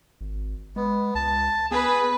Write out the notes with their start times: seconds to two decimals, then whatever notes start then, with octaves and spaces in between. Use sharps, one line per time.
0.21 G#1
0.76 G#3 B3
1.15 C#2 A5
1.71 B3 G#4 B4